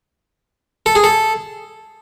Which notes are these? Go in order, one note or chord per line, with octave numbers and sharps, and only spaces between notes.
A4
G#4
A4